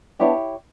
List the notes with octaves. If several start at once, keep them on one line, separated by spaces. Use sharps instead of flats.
B3 D4 E4 G4 C#5